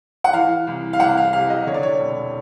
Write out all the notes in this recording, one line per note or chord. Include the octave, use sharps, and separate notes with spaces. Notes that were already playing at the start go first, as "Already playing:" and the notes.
F#5
E3 F5
C2
F5
C2 F#5
F5
C3 F5
D#5
D3 C#5
D5
C#5
E1